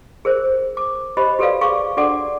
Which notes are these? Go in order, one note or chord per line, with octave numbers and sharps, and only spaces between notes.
G#4 A#4 C5
D6
G4 C5 D#5 B5
F#4 G4 A4 B4 D5 F5
G#4 F5 C#6 D6
D4 F#4 A4 D5 F#5 D6